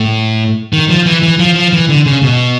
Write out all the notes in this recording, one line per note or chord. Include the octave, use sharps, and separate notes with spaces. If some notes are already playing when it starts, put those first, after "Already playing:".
Already playing: A2
D#3
F3
E3
E3
F3
F3
E3
D3
C#3
B2